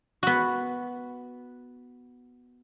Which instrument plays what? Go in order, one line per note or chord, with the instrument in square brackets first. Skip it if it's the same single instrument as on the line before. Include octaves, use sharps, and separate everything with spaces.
[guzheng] B3 F#4